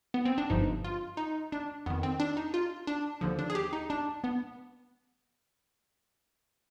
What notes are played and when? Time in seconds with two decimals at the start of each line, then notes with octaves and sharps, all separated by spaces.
0.14 B3
0.25 C4
0.38 D4
0.50 G1 G2 F3 D#4
0.85 F4
1.17 D#4
1.52 D4
1.86 F2 D#3 B3
2.03 C4
2.20 D4
2.37 D#4
2.54 F4
2.87 D4
3.21 D#2 D3 F3
3.39 D4
3.50 G#4
3.55 G4
3.73 D#4
3.90 D4
4.24 B3